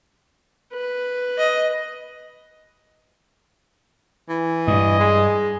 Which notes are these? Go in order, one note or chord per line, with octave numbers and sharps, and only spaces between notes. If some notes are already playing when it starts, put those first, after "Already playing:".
B4
D#5
E3
G2 D#5
G#3